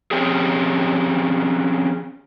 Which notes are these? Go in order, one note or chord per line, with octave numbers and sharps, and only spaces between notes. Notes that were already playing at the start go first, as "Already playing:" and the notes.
F3 C4 C#4 G4 G#4